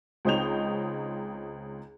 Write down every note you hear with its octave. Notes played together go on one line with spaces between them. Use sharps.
C#2 C4 D#4 C#5 G6 F7